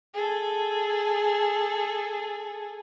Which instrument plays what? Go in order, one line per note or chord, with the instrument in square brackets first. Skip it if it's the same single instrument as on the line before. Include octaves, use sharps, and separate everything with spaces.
[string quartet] G#4 A4